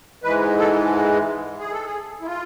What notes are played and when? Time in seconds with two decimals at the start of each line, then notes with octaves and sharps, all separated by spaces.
0.24 G#2 E3 G#3 B4
0.58 A4
1.59 G#4
1.72 A4
1.85 G#4
2.21 E4
2.26 F4